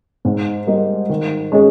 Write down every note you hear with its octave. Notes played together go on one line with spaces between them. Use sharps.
G#2
G3 A#3 D#4
D#3
G#3 C#4 G#4